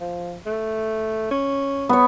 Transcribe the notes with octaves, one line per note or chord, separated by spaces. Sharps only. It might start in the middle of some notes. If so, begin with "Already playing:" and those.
F3
A3
C#4
B3 C#5